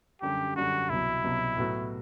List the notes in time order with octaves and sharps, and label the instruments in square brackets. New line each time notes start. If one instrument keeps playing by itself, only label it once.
[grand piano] F#2 D3 G3 [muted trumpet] G4
[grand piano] F#2 D3 G3 [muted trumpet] F#4
[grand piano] C2 B2 F#3 [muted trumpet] E4
[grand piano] C2 B2 F#3
A2 F#3 B3 F#4